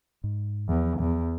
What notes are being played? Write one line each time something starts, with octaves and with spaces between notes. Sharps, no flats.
G#2
E2 F3
E2